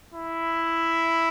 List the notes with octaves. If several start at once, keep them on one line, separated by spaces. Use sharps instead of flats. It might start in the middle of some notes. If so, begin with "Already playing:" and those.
E4